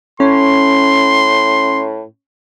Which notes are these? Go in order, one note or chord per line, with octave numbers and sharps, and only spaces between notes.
A2 C#4 C6